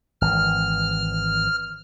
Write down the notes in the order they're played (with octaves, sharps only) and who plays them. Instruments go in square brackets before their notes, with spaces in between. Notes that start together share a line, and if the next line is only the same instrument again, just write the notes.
[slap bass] G#1 E3 [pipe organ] F6